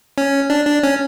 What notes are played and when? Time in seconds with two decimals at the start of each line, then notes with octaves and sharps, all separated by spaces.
0.18 C#4
0.50 D4
0.67 D4
0.83 C#4